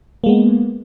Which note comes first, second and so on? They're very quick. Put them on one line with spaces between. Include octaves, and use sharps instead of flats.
A#3 G#3 B3